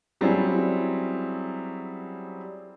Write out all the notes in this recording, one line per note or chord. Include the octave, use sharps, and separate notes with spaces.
F#3 G3 C4 C#4 E4 G#4